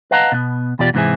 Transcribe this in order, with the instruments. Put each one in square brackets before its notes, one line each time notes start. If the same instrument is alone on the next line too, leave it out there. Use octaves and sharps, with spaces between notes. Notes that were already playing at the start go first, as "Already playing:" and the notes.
[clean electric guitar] B4 D#5 F5 F#5 A5 A#5
B2 B3
E2 B2 F4 G4 D5
G#2 C3 E3 C4 E4 G#4